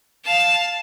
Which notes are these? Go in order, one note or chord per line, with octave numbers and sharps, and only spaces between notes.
F5 A5